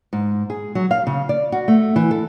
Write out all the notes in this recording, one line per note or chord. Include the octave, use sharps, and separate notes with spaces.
G#2
G#4
F#3
F5
C#3
D5
F#4
A3
E3
A4